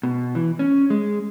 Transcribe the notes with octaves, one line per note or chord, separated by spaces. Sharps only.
B2
E3
C#4
G#3